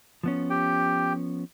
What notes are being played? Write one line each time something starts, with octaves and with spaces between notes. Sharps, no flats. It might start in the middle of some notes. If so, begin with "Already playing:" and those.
F3 B3 C#4
G4 G5